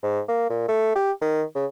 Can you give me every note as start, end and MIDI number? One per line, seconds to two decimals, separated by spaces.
0.03 0.20 44
0.28 0.48 58
0.50 0.67 46
0.68 0.92 57
0.95 1.11 67
1.21 1.43 51
1.55 1.66 49